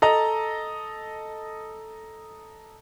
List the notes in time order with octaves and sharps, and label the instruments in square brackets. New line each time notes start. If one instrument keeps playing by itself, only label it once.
[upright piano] A4 D#5 A#5